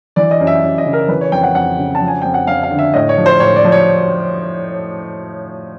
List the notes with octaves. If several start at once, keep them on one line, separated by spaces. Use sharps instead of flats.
E3 D5
D#5
F#2
E5
F#2
D#5
C#3
A#4
E3 B4
C#5
F2 G5
F#5
F2 F#5
C#3
A5
F3
G#5
F2 G5
F#5
F2 F5
F5
D3
E5
A2 D#5
C#5
F3
C5
A2 C#5
D5
F3
C#5